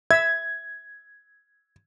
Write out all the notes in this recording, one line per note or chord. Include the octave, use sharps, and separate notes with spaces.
E5 G#6